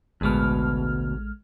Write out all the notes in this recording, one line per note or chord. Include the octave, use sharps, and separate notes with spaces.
A1 D2 B2 G#3 F6